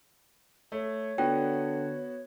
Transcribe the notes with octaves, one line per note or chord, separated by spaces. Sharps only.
A3 C#5
D3 B3 F#4 G5